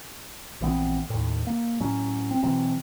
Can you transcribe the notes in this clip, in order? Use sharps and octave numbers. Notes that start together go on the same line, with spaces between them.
A#1 E3 B3 C4
D#2 A2
A#3
A2 F#3 C#4
C4
B2 E3 F#3 C4